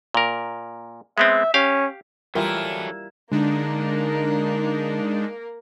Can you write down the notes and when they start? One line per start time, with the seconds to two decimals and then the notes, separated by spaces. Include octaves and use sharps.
0.14 A#2 A#4
1.18 G#3 B3 C4 E5
1.54 C#4 G4 F5
2.35 E3 F#3 G3 E4 F4 G4 A4 A#4
3.32 D3 G#3 A#3 D4 D#4 A#4